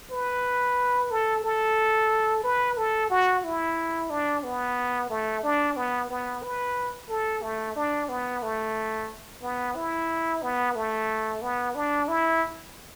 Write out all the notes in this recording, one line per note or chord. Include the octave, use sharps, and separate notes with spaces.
B4
A4
A4
B4
A4
F#4
E4
D4
B3
A3
D4
B3
B3
B4
A4
A3
D4
B3
A3
B3
E4
B3
A3
B3
D4
E4